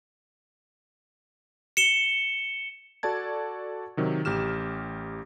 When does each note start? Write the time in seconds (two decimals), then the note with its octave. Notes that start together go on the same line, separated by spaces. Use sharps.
1.77 C#7 E7 G7
3.03 F#4 A4 D5 A5 G#6
3.97 C3 D#3 F#3
4.25 A1 G4 F6 E7